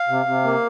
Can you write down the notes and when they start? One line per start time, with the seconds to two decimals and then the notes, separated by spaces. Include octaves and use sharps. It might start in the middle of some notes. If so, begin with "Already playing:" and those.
Already playing: F5
0.08 C3
0.26 C3
0.44 A#3